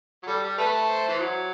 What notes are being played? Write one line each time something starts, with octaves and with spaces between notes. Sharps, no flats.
F#3
G3 A4
G3
A3 B4
C5
E3
F#3